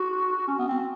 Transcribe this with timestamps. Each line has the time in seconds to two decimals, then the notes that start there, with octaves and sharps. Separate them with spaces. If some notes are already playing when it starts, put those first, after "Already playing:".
Already playing: F#4
0.48 C#4
0.58 B3
0.68 C4